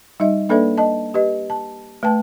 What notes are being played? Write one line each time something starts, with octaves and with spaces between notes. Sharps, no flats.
G3 D#4 D#5 E5
A#3 D4 A4 B4 D5 E5
D#5 A5
G4 B4 D#5
A5
A3 B4 G5 A5